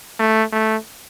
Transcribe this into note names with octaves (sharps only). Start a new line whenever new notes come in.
A3
A3